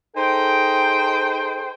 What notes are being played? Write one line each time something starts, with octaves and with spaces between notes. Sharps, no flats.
D#4 G#4 A4 C5 G5